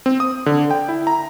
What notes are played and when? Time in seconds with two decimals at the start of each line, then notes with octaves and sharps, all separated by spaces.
0.06 C4
0.20 D#6
0.46 D3
0.71 G5
0.89 E4
1.07 A#5